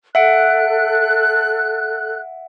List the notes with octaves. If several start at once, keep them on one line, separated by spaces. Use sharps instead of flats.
A4 E5 F#5 F#6 D7